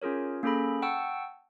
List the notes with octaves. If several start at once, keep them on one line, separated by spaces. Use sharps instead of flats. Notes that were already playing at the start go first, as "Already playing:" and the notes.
C#4 F4 G#4 A#4 C#5
A#3 C#4 G#4 A4 B5
F#5 G5 A5 C#6 E6